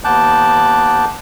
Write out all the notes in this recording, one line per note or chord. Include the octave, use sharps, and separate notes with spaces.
D#2 B3 A5 D6 F#6 G6